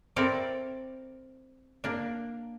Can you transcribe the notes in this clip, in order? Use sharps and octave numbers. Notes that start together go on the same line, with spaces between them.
C4 E4 A4 A#4 D5
A#3 D4